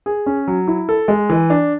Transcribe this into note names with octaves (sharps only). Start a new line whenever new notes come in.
G#4
C#4
F#3
E4
A4
G#3
E3
D4